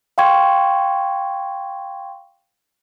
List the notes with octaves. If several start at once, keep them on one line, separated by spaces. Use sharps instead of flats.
F5 G5 C6 C#6 G#6